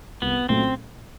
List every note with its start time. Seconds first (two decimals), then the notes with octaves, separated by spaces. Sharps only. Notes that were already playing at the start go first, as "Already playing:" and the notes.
0.22 C2 B3
0.49 A#2 F#3 A3 C4 C#4